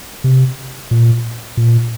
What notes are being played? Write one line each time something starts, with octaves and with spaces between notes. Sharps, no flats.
C3
A#2
A#2